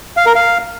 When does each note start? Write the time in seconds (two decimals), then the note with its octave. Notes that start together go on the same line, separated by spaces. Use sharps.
0.17 F5
0.26 A#4
0.35 F5